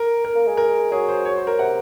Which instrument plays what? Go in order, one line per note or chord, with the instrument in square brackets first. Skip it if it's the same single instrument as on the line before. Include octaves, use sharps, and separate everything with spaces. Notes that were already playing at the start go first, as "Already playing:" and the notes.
Already playing: [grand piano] A#4
A#4
[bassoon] A#3
G#3
[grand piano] A#4
[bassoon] F#3 [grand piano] G#4
[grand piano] C5
C#5
C5
A#4
[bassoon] C3 [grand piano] F#5